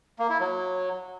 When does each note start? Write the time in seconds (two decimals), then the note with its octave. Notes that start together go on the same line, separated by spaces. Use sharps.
0.19 A#3
0.29 E4
0.40 F#3